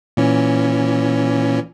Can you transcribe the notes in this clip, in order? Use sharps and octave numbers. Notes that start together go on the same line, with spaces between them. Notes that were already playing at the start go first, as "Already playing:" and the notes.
A#2 E3 C#4